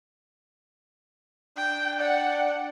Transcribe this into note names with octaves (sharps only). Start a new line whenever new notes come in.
D4 G5
D5 F#5 G5